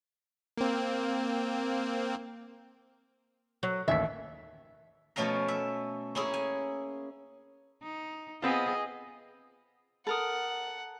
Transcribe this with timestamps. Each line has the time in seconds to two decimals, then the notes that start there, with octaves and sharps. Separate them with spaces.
0.57 A#3 C4
3.63 F#3
3.88 A1 D#2 E5 B6
5.16 B2 F3 A3 C#4 F5 A#5
5.48 E5
6.15 A#3 C#4 E4 G#4
6.34 G#5
7.83 D#4
8.42 B3 C4 F4 G#4 D#5
10.07 A4 A#4 F#5 D#6